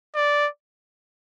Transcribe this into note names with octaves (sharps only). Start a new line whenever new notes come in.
D5